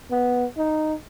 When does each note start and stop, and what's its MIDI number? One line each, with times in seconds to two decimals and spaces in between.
0.11 0.45 59
0.58 0.94 63